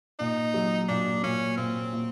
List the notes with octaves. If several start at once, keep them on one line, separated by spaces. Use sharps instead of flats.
A#2 D#4
F#3
A#2 D4
A#2 C#4
A#2 C4
A#2